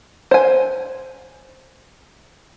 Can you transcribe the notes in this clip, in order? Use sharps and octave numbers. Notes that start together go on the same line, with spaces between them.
C5 G#5